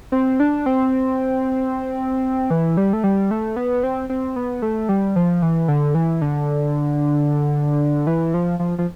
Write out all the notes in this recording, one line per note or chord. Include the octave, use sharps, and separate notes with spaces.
C4
D4
C4
E3
G3
A3
G3
A3
B3
C4
C4
B3
A3
G3
F3
E3
D3
E3
D3
E3
F3
F3
F3